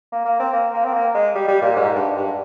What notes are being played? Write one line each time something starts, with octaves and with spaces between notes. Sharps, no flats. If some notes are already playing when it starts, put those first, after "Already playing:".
A#3
A#3
C4
A#3
A#3
C4
A#3
G#3
G3
G3
A#2
G#2
G2
G2